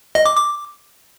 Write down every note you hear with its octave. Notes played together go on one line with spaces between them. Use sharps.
D#5
D6
D6